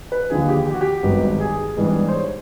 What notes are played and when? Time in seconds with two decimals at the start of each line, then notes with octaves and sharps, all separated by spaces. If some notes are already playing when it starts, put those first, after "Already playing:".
0.12 B4
0.30 D#2 D3 F3 G#4
0.49 G4
0.67 G4
0.74 F#4
0.81 G4
1.03 G#1 G2 D#3 F#3 B3
1.40 G#4
1.77 G#2 E3 G3 B3 D4
2.08 C5
2.13 C#5